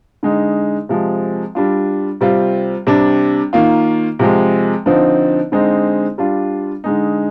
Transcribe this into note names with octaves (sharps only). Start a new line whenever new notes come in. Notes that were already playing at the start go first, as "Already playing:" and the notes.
D3 G#3 D#4
C3 F3 G#3
G3 D4 F4
C3 G3 C4 F4
C3 G3 D4
D#3 A#3 F4
C3 F3 G#3
D3 F3 C4 D#4
D3 G#3 C4 D#4
G3 D4 F4
D3 G#3 D#4